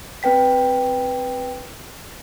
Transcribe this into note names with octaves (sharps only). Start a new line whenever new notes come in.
C4 B4 G5 B6